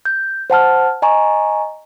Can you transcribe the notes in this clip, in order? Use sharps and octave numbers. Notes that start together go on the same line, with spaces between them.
G6
C5 F#5 A5 F6
D#5 G#5 A#5 C#6